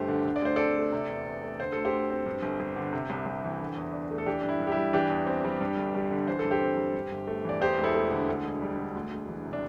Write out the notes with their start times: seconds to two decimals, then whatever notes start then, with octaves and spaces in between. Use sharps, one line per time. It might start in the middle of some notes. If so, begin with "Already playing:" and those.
Already playing: G1 G2 A3 G4 C5
0.08 D3
0.25 D3
0.36 D5
0.42 D2 C5
0.56 C4 A4 D5
0.76 A3
0.92 C3
1.09 E2
1.27 E2
1.43 A3
1.60 D3 C5
1.72 D2 A4
1.85 G4 C5
1.93 D2
2.10 C4
2.26 G2
2.42 G1
2.60 G1
2.76 D3
2.93 C3
3.10 C2
3.26 C2
3.44 E3
3.60 D3
3.77 E2
3.93 D4
4.11 A3
4.18 A4
4.26 E3 D4 G4
4.41 G2 D4
4.49 E4
4.60 G2
4.67 G4
4.72 E4
4.77 G3
4.93 E3 D4 G4
5.10 E2
5.27 C4
5.45 G3
5.61 G2
5.77 G1
5.95 G3
6.11 D3
6.27 E3 C5
6.39 A4
6.45 G2
6.51 G4 C5
6.61 C4
6.77 G3
6.94 G2
7.12 G1
7.27 A3
7.44 E3 D5
7.61 E2 G4 C5
7.78 E1
7.84 E4 A4
7.94 A3
8.11 D3
8.29 D2
8.45 E1
8.62 G3
8.78 D3
8.95 D2
9.12 E1
9.28 E3
9.45 C3
9.53 D4